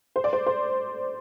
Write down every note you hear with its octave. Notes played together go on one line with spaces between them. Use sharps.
C5
D5
C5
C5